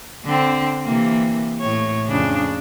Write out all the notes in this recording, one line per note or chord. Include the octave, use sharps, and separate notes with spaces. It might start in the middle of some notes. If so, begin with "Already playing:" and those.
D3 C4
C3 E3 A#3
A2 C#5
F2 C#3 D4